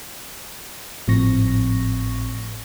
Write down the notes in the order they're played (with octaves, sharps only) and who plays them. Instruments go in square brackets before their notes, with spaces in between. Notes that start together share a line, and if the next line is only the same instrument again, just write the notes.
[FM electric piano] G#1 A2 F3 C4 C#6 A#6